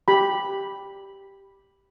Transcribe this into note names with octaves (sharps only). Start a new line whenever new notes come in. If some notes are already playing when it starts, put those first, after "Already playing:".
G4 B5